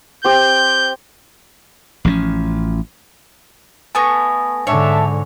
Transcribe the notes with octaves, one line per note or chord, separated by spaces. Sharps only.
C4 G4 G6
A1 F3 B3 C#4
A3 B3 G#5 C#6 A#6
G#2 D3 D4 C#5 E5 A5